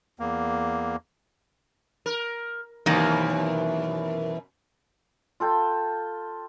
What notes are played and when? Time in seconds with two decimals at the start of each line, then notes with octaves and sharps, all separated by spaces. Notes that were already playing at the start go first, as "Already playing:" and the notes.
0.19 E2 A#3
2.06 A#4
2.86 F#2 B2 D#3 E3 A#3
5.40 F4 A4 G5